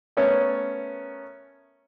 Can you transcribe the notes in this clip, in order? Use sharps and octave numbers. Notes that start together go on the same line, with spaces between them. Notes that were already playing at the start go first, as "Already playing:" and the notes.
A3 B3 C#4 A#4 C#5